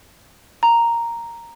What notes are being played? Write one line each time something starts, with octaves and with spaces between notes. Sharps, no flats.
A#5